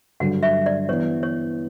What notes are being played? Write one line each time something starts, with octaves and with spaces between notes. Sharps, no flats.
G2 D3 F#3 F#5
E5
D5
E3 G3 B3 C#5
C#5